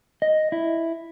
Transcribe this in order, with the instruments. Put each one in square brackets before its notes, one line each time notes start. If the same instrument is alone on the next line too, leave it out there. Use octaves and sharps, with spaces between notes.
[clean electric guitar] D#5
E4